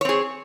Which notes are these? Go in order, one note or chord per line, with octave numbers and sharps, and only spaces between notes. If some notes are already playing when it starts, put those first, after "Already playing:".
C4 G#4 C#5